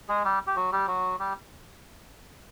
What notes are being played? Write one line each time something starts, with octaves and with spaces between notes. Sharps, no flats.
G#3 G#4
G3 G4
G4
F#3 F#4
G3 G4
F#3 F#4
G3 G4